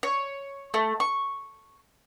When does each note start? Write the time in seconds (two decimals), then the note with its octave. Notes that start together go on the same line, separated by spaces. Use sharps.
0.03 C#5
0.74 A3
1.00 C#6